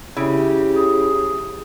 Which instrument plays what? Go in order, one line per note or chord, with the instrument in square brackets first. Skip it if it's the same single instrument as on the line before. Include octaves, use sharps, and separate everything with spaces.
[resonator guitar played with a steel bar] C#3 [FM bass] E4 [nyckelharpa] G4
[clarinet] G#4